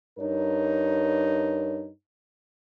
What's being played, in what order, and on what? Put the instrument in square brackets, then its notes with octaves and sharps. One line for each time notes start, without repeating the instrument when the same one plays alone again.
[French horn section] G2 D#4 A#4 C#5